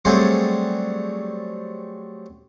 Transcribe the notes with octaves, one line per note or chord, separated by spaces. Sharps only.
F#3 G3 A3 C4 G#4 C5